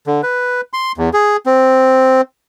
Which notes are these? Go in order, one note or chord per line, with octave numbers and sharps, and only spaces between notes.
D3
B4
C6
E2
G#4
C4